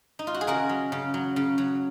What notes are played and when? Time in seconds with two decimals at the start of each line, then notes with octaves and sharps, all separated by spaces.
0.19 D#4
0.27 F4
0.34 F#4
0.41 G#4
0.47 C#3 F#4 A#4
0.69 F#3
0.92 C#3
1.14 F#3
1.36 C#3
1.58 F#3